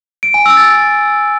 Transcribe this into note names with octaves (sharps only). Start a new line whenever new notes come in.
D7
G#5
E6
A6